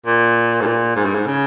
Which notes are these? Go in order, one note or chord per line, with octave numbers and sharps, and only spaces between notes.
A#2
G#2
A#2
G#2
G2
G#2
C#3